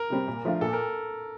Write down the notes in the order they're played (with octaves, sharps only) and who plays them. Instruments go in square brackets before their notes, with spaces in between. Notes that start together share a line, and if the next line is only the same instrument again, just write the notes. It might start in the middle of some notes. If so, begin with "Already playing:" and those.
Already playing: [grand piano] A#4
[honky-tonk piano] C3 G3 C4
A#2
F3 A3 D4 F4
[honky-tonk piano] A#2 [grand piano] A4
[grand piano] A#4